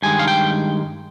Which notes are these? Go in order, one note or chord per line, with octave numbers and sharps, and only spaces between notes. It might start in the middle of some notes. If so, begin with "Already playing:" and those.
G2 D#3 G#3 G#5
F5
G5